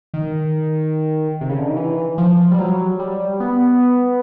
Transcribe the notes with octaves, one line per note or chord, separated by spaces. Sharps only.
D#3
C3
C#3
D3
D#3
E3
F3
G3
F#3
G3
B3